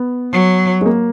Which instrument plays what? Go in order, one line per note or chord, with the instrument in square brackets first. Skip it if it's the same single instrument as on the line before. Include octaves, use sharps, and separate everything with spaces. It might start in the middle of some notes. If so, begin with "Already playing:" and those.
Already playing: [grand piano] B3
[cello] F#3
[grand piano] G#3
A#3